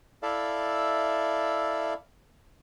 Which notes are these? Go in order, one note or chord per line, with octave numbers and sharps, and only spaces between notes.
E4 A4 D5 E5 F5